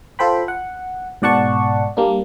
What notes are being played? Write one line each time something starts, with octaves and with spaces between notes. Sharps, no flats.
F4 A4 C5 G5 B5
F#5
G#2 B2 D5 F#5 A5 C#6
G3 A#3 D4